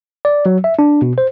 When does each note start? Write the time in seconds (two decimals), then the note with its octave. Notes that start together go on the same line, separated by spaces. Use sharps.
0.25 D5
0.46 F#3
0.64 E5
0.79 D4
1.02 B2
1.18 C5